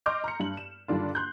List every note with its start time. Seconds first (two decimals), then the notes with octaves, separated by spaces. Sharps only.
0.06 D#5 C6 D6 F6 G6
0.24 A#5 C6 C#7
0.40 G2 F#7
0.57 E7
0.88 G2 D3 D#3 D4 F4
1.15 C6 F#6 G6